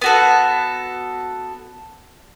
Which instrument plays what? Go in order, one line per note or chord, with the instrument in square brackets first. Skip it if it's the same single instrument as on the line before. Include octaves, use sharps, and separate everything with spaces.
[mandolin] B3 F#4 A4